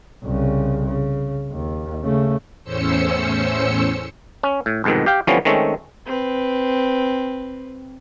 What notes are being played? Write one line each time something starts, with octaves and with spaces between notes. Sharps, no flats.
C2 C#3
C#3
D#2
C#3 A3
E2 A2 C#4 C5 E6 C#7
C#4
A2
C2 F2 G#2 B2 D#3
G4 F5 G5
D3 E3 F3 G3 B3 C#4
D#3 G#3 A3 C4 C#4
C4 B4